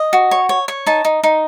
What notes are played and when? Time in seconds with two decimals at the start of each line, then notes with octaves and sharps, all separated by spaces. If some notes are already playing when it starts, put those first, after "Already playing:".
Already playing: D#5
0.13 F#4
0.31 C#5
0.49 C#5
0.68 C#5
0.86 D#4 A5
1.05 D#4
1.23 D#4